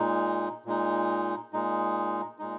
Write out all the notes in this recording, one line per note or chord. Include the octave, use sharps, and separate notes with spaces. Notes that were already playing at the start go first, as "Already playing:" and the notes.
Already playing: A#2 G#3 D#4
A#2 G#3 D#4
A#2 G#3 D#4
A#2 G#3 D#4